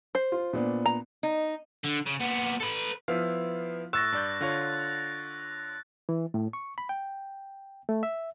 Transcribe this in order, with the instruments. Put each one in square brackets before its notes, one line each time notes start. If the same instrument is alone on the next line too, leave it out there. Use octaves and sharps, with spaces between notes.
[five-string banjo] C5
[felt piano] F4
A#2 B3 D4
[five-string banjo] A#5
[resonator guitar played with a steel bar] D#4
[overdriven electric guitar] D3
C#3
A#2 B3
A4 B4
[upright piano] F3 B3 E4 [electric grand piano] F5
[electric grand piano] A2 E7 [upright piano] C#6 E6 [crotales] F#6 A6 A#6
[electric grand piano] G2 D5 G6
D3 F4 C#5
[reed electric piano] E3
A2
C#6
B5
G5
A3
E5